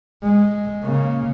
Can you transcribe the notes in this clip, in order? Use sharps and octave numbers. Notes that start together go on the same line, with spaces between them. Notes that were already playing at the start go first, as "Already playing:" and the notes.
G#3
C#3 A#3